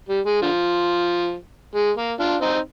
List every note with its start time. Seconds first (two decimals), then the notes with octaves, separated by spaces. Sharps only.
0.09 G3
0.26 G#3
0.42 D3 F3
1.75 G#3
1.97 A#3
2.20 D4 F4
2.41 C4 D#4